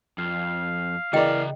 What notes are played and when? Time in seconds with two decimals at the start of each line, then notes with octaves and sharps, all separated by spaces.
0.18 F2 F5
1.13 C#3 E3 A#3 G#4 D5 D#5 G5 A#5